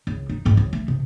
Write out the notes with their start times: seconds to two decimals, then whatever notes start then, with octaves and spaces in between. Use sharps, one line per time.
0.07 C#2
0.30 D#4
0.45 F2 G#2
0.57 C#2
0.73 A3
0.88 C3